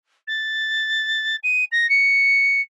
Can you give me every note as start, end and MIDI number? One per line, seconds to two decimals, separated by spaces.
0.27 1.36 93
1.43 1.64 99
1.71 1.89 94
1.89 2.61 97